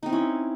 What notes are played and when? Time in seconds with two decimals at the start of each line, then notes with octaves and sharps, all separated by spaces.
0.03 D#4
0.06 C4
0.09 E4
0.13 C#4